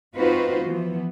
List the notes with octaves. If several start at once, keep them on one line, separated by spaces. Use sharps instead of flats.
C4 D#4 F4 F#4 B4 C5
E3 F3 B3